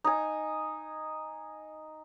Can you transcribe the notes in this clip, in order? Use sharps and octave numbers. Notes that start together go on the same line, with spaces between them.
D#4 G#5